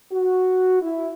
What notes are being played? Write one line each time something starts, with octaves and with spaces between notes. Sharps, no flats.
F#4
E4